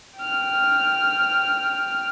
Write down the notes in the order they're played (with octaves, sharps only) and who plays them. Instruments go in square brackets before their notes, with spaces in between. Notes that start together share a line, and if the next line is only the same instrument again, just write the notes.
[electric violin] G5 F6